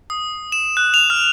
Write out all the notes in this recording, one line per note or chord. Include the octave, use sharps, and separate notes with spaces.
D#6
E7
F#6
F7
F6